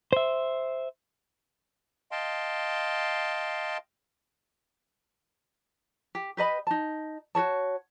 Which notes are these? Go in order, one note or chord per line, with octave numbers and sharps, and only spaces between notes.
C5 E5
D#5 F5 G5 A5 C6
G4
G4 B4 D#5 B5
D#4 A5
F#4 A#4 C#5 A5